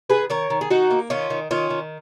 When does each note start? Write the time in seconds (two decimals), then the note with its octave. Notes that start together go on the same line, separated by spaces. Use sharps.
0.10 D#3 G#4 B4
0.30 D#3 A#4 C#5
0.50 D#3
0.61 G#4
0.70 D#3 D#4 F#4
0.91 A#3
1.10 D#3 C#4 F4
1.30 D#3
1.51 D#3 C#4 F4
1.70 D#3